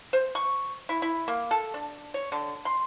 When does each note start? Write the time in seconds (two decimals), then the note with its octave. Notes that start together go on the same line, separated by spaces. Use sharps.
0.13 C5
0.35 C#6
0.89 E4
1.02 E4
1.28 A#3
1.51 A4
1.74 D4
2.14 C#5
2.32 D3
2.65 C6